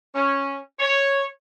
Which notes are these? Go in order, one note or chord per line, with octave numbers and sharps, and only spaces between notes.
C#4
C#5